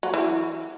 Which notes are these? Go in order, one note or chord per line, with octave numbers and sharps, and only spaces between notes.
F#3
E3